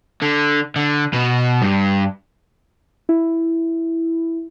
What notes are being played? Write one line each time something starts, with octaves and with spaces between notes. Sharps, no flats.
D3
D3
B2
G2
E4